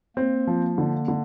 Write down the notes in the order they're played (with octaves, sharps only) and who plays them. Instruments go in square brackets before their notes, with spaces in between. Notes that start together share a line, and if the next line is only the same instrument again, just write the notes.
[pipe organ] A#3 [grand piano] C4
[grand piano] F3
D3
D3